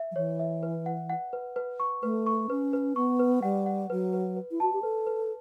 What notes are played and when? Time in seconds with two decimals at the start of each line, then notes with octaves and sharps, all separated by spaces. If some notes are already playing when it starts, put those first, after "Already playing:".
Already playing: E5
0.11 F#3
0.16 E3 C#5
0.39 E5
0.63 B4
0.86 F#5
1.10 F#5
1.33 B4
1.56 B4
1.80 C#6
2.03 A3 B4
2.26 C#6
2.50 C#4 B4
2.73 B4
2.96 B3 C#6
3.19 B4
3.42 G3 F#5
3.66 F#5
3.90 F#3 B4
4.13 B4
4.36 B4
4.51 E4
4.60 F#4 A5
4.73 G4
4.83 A4 B4
5.06 B4